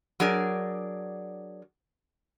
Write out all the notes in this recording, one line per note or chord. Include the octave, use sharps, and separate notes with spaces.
F#3 D4 G#4 A#4 D5